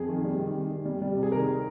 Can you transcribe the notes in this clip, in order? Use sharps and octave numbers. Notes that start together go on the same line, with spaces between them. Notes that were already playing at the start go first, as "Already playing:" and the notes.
Already playing: F2 G#4
D#3
G3
D#3
D#3
D#3
G3
G3
C3
G#4
D#3 A#4